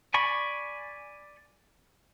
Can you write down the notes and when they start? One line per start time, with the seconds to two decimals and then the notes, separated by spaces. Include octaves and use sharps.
0.14 D5 G#5 B5 C#6